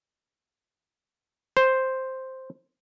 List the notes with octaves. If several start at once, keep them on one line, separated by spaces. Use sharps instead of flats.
C5